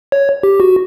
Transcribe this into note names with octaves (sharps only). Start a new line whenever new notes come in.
C#5
G4
F#4